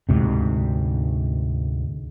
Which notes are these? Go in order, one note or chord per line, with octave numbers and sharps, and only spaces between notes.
D2 G#2 C3